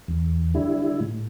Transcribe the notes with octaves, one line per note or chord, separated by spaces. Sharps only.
E2
D3 G3 E4
A2